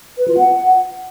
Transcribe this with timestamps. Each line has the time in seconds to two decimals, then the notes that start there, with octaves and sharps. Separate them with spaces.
0.18 B4
0.28 F4
0.38 F#5